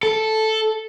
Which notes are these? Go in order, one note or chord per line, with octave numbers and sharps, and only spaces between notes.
A4